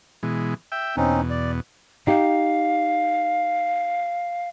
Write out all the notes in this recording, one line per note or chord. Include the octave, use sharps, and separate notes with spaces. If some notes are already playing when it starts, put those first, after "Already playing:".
B2 E3 G#3
E5 G5
E2 B2 C4 C#4 D#4
D5
D#4 G4 F5